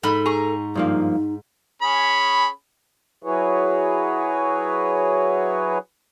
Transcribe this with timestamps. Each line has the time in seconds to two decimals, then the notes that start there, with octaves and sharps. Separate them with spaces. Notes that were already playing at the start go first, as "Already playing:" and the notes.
0.03 G#2 A4 B5
0.26 G#4 A#5 C#6
0.75 G2 F3 A#3 D#4
1.82 C#4 G#4 B5
3.23 F#3 E4 F#4 G#4 B4 C#5